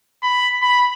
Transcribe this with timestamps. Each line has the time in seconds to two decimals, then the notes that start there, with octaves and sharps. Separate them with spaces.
0.23 B5
0.62 B5